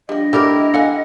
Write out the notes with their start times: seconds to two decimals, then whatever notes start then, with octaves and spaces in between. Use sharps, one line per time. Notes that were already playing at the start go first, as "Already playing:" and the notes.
0.09 F3 G3 D4 D#5 G5
0.33 E3 G3 A3 E4 G4 A#4
0.74 A4 F5 F#5 G#5